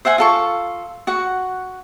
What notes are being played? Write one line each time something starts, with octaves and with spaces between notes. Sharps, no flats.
C5 E5 F#5 G#5
F4 A4 C#6
F#4 F#5